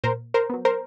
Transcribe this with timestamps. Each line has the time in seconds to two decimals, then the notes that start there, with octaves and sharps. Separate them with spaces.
0.04 A#2 A#4 C5
0.34 A#4 C5
0.50 F#3 B3
0.65 A#4 C5